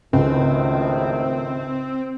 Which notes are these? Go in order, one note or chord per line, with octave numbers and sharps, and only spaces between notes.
G#1 C#2 A2 D#3 C4